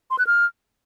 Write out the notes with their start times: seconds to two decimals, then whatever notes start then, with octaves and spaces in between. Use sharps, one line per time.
0.10 C6
0.19 F#6
0.27 F6